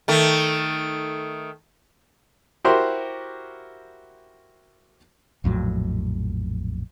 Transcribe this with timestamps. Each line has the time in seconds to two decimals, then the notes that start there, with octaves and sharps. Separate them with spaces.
0.08 D#3 A3
2.64 E4 F#4 G4 A#4 C5 C6
5.44 A#1 F2 A2 F#3